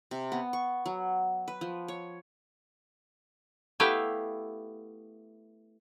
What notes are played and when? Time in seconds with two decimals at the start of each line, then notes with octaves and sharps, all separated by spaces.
0.11 C3
0.32 B3
0.53 C#6
0.86 F#3
1.48 B4
1.61 F3
1.88 C#5
3.80 A3 B3 E4 G4 F5 G5